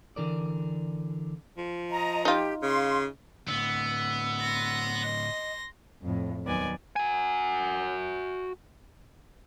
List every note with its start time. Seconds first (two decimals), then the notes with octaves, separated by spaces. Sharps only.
0.16 D3 E3 A#4 D5
1.57 F3
1.90 D#5 A#5
2.25 D#4 F4 G4
2.62 C#3 F5 C6
3.48 A2 D3 B3 E6
4.40 C6 A#6
5.04 D#5
6.01 F2 A2
6.43 D#2 D#3 F#3 B3 D5 G#5
6.96 F#4 G#5